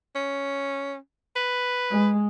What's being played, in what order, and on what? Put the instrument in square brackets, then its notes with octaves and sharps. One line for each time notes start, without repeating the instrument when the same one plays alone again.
[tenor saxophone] C#4
B4
[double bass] G#3